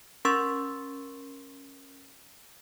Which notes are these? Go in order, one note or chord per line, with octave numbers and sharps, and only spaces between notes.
C#4 A#4 C6 C#6 E6 A6